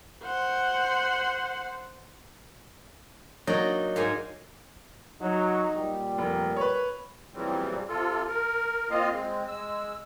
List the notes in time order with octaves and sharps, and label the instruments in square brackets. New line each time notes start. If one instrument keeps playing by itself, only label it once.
[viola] C5 F#5
[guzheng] F#3 A#3 D#4 F#4 D5
G#2 A#3 G#5
[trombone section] F#3 [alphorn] D#4
[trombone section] A#2 G3
[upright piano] F1 [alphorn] A#4
[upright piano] B4 C#5
[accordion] A#2 C#3 E3 F#3 G3 C4
C3 F4 A4
A#4
A#3 C4 F4 D#5 F5
G#3 C4
G#3 E6